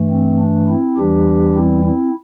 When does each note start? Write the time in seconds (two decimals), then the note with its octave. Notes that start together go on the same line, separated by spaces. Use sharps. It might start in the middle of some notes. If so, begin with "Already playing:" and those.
Already playing: G2 E3 A3
0.10 C4
0.39 D4
0.68 C4 E4
0.97 E2 E3 G3 D4 G4
1.55 C4 E4
1.84 C4 E4